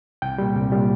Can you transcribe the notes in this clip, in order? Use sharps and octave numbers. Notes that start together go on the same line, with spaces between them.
C2 G5
A#2 G3
C2
A#2 G3